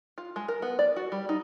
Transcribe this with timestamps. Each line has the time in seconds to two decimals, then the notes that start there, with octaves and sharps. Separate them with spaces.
0.18 F4
0.36 G#3
0.48 A#4
0.62 B3
0.79 D5
0.96 F#4
1.12 G3
1.29 D#4